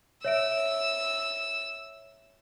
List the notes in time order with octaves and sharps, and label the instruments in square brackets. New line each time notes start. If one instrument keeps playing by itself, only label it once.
[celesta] C#5 E5 D7 [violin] E6